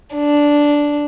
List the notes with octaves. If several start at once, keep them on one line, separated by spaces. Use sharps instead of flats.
D4